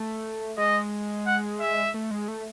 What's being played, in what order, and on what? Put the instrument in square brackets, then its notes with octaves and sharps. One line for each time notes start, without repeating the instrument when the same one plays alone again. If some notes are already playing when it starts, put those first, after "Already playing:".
Already playing: [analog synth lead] A3
[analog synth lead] G#3 [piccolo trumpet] D#5
[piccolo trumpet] F#5
E5
[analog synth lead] A3
G#3
A3